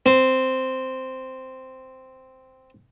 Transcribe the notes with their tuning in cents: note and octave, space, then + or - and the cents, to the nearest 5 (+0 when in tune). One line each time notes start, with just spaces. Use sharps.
C4 -5